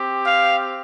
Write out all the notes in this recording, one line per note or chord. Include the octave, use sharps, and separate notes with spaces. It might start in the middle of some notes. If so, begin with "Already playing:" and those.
Already playing: C4 G4
F5